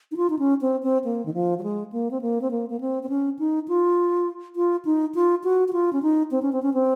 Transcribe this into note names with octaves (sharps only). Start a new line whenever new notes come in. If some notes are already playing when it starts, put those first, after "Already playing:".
D#4
F4
D#4
C#4
C4
C4
A#3
D#3
F3
F#3
G#3
A#3
C4
A#3
C4
A#3
A#3
C4
C4
C#4
D#4
F4
F4
D#4
F4
F#4
F#4
F4
C#4
D#4
C4
C#4
C4
C#4
C4